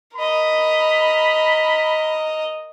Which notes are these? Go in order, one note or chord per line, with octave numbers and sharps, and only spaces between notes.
A#4 D#5 B5